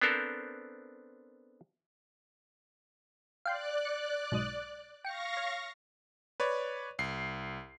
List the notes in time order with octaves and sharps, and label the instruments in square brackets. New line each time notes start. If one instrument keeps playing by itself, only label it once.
[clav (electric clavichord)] B3 C4 D4 A4 A#4 C5
[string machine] D5 F#6 [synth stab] F5 G5 C6
[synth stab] C#7
B1 G#2 D#6
[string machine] F5 C#6 A#6 [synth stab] G5 C#7
[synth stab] C#5
[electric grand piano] B4 C#5 D5
C2 C7